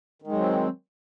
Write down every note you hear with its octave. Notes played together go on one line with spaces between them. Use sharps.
D#3 F#3 G#3 C4